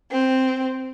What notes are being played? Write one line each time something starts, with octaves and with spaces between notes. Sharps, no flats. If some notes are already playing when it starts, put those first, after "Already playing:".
C4